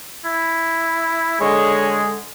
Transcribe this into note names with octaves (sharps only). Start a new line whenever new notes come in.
E4
D3 G#3 C#5